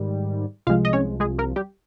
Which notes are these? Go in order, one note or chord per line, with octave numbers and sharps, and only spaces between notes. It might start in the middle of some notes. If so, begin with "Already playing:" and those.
Already playing: G#2 D#3 G3
C2 C3 F3 G#3 F4 F5
D#5
C#4 C#5
G#3 G#4
A#3 A#4
G3 G4